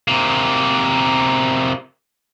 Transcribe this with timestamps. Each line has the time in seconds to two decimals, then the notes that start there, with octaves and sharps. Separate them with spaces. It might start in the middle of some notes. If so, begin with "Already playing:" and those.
0.08 C3 A#3